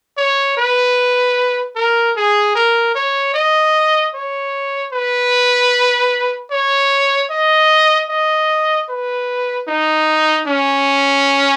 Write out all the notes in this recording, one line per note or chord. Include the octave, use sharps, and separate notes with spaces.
C#5
B4
A#4
G#4
A#4
C#5
D#5
C#5
B4
C#5
D#5
D#5
B4
D#4
C#4